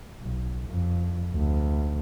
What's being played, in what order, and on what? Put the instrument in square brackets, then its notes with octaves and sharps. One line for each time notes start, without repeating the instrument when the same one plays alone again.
[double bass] B1
F2
D2